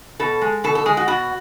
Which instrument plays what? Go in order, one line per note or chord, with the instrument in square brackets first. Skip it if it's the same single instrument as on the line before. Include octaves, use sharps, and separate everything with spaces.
[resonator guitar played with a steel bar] B2 A4
G#3
B2 A4
A4
G#3 G#4
F#4
B2 F#4